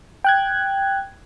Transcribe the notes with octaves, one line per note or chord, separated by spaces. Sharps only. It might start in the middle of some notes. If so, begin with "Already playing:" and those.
G5 F#6 G#6